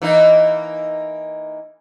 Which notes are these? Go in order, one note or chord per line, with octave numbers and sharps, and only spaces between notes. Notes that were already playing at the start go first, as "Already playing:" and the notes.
E3 A#3 D#4